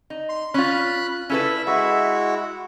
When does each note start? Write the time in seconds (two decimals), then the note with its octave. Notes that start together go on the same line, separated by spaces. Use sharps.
0.10 D#4
0.29 C6
0.54 C#4 F4 B5 F#6
1.29 C#4 E4 A4 B4 E5
1.67 G#3 E4 F#4 E5